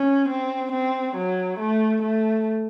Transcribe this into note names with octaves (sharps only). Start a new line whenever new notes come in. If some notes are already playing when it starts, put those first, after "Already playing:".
Already playing: C#4
C4
C4
F#3
A3
A3